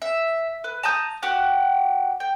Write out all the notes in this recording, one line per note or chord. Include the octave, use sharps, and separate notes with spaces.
E5
B4
A5 A#5 D#6 G6
F#4 G4 F#5
G5